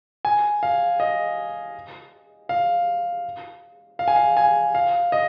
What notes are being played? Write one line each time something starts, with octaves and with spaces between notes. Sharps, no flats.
G#5
F5
D#5
F5
F5
G#5
F5
G#5
F5
D#5